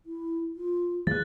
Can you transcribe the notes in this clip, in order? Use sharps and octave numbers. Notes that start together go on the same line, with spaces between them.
E4
F4
E3 G3 A#3 G#4 F#6 A6